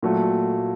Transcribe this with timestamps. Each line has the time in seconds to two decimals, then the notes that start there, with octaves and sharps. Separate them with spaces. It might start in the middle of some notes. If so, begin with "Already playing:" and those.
0.03 A#2 F#3 A3